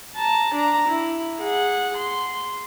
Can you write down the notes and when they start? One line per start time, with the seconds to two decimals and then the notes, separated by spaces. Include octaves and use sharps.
0.15 A5 A#5
0.55 D4 A#5
0.88 E4
1.40 G#4 F#5
1.98 C6